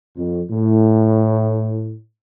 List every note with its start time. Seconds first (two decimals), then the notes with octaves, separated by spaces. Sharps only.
0.17 F2
0.52 A2